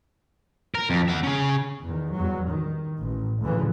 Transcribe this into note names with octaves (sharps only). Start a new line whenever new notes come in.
A#4
F2
E5 F#5
C#4 G#4
E2 D#3
E2 G2 F#3
D#3
A1
D2 A2 C#3 E3 F3